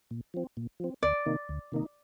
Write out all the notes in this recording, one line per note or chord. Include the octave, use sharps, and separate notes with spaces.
A#2
F3 C4
A#2
F3 C4
D2 D5
C3 D#3 A#3 D#4
D2
C3 D#3 A#3 D#4